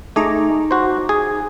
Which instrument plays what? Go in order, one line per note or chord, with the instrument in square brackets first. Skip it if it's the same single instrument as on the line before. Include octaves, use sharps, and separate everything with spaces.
[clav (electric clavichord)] A3 G#4 [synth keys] D#4 A#5 D6
[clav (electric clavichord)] F#4 C5
G#4